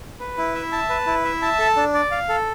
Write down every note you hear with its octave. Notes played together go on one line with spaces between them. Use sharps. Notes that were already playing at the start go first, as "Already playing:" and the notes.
B4
E4
E5
A5
B4
E4
E5
A5
A4
D4
D5
F5
A4